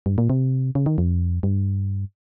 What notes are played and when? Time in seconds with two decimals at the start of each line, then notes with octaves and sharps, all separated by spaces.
0.06 G2
0.18 A#2
0.30 C3
0.75 C#3
0.86 D#3
0.98 F2
1.43 G2